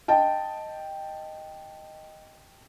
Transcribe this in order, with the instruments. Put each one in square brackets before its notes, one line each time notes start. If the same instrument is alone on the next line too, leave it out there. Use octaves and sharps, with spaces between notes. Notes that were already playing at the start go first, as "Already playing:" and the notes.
[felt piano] D#5 G5 A5